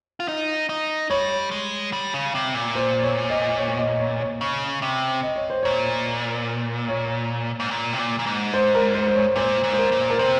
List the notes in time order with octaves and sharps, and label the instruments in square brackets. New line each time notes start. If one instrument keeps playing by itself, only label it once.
[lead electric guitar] F4
D#4
D#4
[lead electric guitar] G3 [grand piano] C#5
[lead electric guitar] G#3
G3
C#3
C3
A#2
[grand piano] C5
C#5
D#5
C#5
C#5
D#5
C#5
C#5
[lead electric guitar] C#3
C3
[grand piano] D#5
C#5
C5
[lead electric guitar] A#2 [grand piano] C#5
[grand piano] C#5
[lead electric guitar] G#2
A#2
C3
A#2
A#2
G#2
[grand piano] C5
A#4
C5
C5
C#5
[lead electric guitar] A#2 [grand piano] C5
[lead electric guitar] G#2
[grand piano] C5
A#4
[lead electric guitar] A#2
[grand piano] A#4
[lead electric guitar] C3 [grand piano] C5